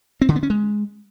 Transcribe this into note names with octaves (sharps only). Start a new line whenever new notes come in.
C4
D3
B3
C#4
G#3